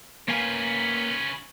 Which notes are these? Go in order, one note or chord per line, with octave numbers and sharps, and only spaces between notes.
A#3 C#4 B4 F5 G#5